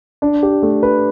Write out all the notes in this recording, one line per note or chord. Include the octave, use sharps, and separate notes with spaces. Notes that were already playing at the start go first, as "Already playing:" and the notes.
D4
G4
A3
B4